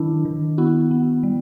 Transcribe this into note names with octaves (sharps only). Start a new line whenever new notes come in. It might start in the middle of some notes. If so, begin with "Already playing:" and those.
Already playing: D#3 F#3 D4 E4
D#3
B3 E4 F#4
B3
G3